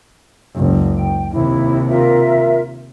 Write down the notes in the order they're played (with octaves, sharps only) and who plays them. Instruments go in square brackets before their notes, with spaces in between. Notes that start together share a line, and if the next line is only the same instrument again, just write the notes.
[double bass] F#1 C#2
[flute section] G5
[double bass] D#2 C3 [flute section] E4
[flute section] F4 A#4 E5